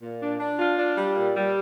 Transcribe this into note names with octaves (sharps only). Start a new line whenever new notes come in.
A#2
D4
D4
F4
D4
G3
A#2
G3